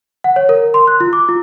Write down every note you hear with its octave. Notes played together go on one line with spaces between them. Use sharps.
F#5
C#5
A#4
C6
F#6
F4
D6
F4